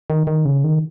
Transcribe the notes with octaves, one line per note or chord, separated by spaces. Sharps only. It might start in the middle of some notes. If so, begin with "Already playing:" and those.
D#3
D#3
C#3
D#3